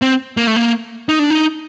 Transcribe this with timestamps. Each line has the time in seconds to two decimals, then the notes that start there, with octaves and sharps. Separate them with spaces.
0.02 C4
0.37 A#3
0.47 A3
0.56 A#3
1.09 D#4
1.19 D4
1.30 D#4